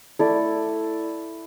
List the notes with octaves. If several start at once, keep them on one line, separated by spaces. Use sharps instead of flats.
A3 E4 A4 D5